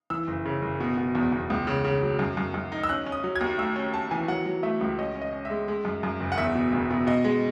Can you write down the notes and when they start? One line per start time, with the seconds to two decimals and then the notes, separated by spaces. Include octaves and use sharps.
0.10 E3 E6
0.28 F#1
0.45 C#3
0.62 F#1
0.80 B2
0.97 B2
1.15 E2
1.32 E2
1.50 C#2
1.67 C#3
1.84 C#3
2.02 F#3
2.19 F#2
2.37 F#2
2.54 F#2
2.72 D#4
2.83 E6
2.89 C#4 F#6
3.06 C#4
3.12 D#6
3.24 F#3
3.36 G#6
3.41 D#2
3.58 A3 E6
3.76 C#4
3.94 C#4 A5
4.11 E3 G#5
4.28 F#3 F#5
4.46 F#3
4.63 A3 E5
4.81 C#2
4.99 C#4 D#5
5.16 C#4
5.22 D#5
5.33 C#4
5.45 E5
5.50 G#3
5.68 G#3
5.85 F#2
6.03 F#2
6.20 F#1
6.32 F#5
6.38 E2 E5
6.55 B2
6.73 E1
6.90 B2
7.07 B2 D#5
7.24 G#3